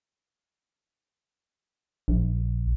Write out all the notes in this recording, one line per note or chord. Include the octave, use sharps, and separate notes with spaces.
A#1